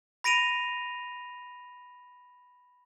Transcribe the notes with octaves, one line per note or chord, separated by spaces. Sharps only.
B5 A#6 D7 D#7 F7